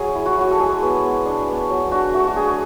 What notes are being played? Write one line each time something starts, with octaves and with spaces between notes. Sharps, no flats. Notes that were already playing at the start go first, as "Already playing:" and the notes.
Already playing: F#3 G#4
E4
F#4
F#3 F#4
A4
G#3 G#4
B3
B3
D4
B3
F#3
D4 F#4
A3 F#4
F#4
D4 G#4